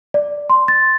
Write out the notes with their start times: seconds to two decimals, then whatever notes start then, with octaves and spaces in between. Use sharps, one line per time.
0.14 D5
0.50 C6
0.68 A6